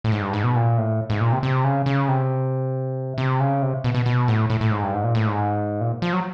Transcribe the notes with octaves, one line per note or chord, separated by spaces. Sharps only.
A2
G#2
G2
G#2
B2
A#2
A2
G#2
A#2
C3
C3
C#3
C#3
C3
C3
C#3
C3
B2
B2
B2
A2
A2
A2
G#2
G2
G#2
A#2
A2
G#2
A#2
F3
F#3